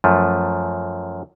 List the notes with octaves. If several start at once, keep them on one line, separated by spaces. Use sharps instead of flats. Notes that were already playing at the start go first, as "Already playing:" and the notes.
F#2 F3 A3